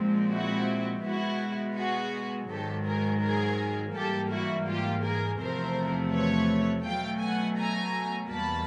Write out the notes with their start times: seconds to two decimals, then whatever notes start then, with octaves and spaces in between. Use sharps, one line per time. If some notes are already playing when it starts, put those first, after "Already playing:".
Already playing: A#2 F3 G#3 C4
0.33 E4 F#4
1.05 B2 G#3 B3 E4 F#4
1.77 F#4 G#4
2.50 G#2 D#3 F#3 G4 A4
2.86 G#4 A#4
3.23 G#4 A#4
3.95 G#2 E3 G3 A#3 G4 A4
4.31 E4 F#4
4.68 F4 G4
5.04 G#4 A#4
5.40 E2 C3 F3 A3 A#4 C5
6.13 B4 C#5
6.85 B2 F#3 A3 F5 G5
7.21 F#5 G#5
7.57 G#5 A#5
8.30 E2 B2 G3 A#3 A5 B5